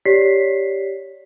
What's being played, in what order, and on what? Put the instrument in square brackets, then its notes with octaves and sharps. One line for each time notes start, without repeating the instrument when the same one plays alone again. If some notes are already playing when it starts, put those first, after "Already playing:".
[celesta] G4 C#5 D5 B6 C7